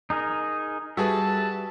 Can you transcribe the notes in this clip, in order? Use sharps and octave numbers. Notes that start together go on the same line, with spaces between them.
D#4 G#4 A#4
G3 F#4 G#4 A4 B4 E5 A5